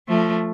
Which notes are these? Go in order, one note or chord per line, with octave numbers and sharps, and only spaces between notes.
F3 A3